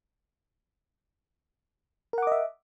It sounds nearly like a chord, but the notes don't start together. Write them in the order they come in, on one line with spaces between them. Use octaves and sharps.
A#4 F#5 D6 D#5 E5